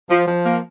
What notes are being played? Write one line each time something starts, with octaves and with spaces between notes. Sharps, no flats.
F3
F3
A#3